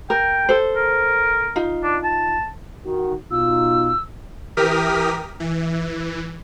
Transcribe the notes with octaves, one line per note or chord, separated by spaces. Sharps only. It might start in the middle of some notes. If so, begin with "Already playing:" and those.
A#4 G5
A4 C5
A#4
D#4 F4
D4
A5
D#3 F#4
B2 D#4 F4 E6
E3 G4 A#4 D#6 F6 B6
E3